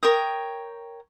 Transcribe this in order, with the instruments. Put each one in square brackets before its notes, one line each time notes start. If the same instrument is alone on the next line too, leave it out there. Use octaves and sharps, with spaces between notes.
[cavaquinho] A#4 C#5 G5 D#6